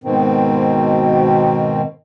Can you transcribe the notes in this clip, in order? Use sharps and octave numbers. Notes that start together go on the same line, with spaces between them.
G#2 B2 D#3 C4